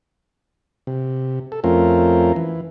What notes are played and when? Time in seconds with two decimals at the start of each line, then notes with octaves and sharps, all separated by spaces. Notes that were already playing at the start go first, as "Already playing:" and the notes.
0.87 C3
1.52 A4
1.64 F2 A3 C4 C#4 F4 A#4
2.36 E3